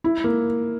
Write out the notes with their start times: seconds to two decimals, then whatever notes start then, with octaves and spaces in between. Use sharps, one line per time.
0.04 E4
0.24 A#3